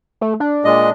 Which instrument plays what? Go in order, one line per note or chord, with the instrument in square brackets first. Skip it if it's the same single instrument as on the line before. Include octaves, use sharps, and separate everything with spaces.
[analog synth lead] A3
D4
[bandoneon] A#2 G#3 D#5